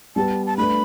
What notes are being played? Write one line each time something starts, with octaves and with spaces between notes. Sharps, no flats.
G3 B3 G4 B4 A5
A5
A3 D4 B4 B5